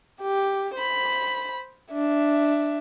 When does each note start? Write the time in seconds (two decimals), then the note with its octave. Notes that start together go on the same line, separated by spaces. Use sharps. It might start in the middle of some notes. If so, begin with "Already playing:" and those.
0.22 G4
0.75 C5 B5
1.92 D4 E5